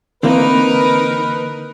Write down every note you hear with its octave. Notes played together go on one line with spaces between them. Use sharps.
D3 E3 A#3 C4 D#4 A#4 B4